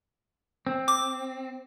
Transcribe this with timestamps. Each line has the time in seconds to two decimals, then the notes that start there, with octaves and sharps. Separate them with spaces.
0.66 C4
0.88 D6